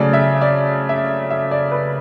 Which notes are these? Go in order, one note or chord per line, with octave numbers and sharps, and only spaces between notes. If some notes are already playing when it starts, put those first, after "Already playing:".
Already playing: C#3 F#3 A3 D5
E5
D5
E5
E5
D5
B4